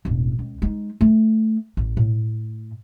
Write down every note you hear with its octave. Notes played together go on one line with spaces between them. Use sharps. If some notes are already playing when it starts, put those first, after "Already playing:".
E1 A1
C#2
G#3 D#4
A3
A1
A2